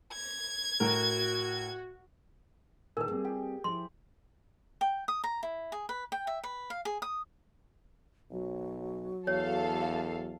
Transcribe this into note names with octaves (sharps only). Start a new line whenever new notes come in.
G#6
A2 F#4 A#4
A#2 D#3 G#4 A#4 B4 A5
G3 A#3 C4
G4
F3 E4 C6
G5
D#6
A#5
E4
G#4
B4
G5
E5
B4
F5
G#4
D#6
B1 F#3
E2 A4 C#5 F5